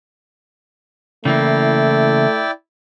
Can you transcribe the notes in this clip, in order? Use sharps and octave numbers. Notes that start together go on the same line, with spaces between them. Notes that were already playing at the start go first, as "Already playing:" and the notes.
C#3 E3 A3 A#3 E4 D5 G5